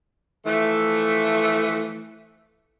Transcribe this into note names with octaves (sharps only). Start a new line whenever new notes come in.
E3 F3 A3